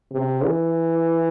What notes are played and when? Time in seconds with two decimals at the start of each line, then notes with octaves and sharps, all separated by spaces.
0.12 C3
0.44 E3